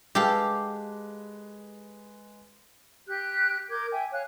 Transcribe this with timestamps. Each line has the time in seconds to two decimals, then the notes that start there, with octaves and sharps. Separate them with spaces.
0.15 G#3 G4 A4 B4 F5
3.07 G4 F#6 G6
3.70 A#4 D6 G6 G#6
3.92 E5 G5 G#5
4.12 C#5 F5 G#5 F#6